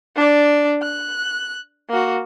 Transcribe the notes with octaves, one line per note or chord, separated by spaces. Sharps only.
D4 D5
F#6
A#3 F#4